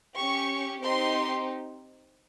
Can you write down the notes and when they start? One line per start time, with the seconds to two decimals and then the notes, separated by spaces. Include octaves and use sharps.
0.17 C#4 G4 C#6
0.82 C4 D#4 G4 C6